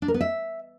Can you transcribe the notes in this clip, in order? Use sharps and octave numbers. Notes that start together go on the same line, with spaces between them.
D4
A#4
B3
E5